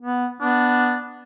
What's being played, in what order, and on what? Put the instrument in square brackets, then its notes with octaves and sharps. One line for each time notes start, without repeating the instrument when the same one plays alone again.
[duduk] B3
[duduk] B3 [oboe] D4